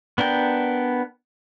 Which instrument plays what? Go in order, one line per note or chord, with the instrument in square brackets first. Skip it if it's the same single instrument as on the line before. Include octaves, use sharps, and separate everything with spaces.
[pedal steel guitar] B3 D4 A#4 G5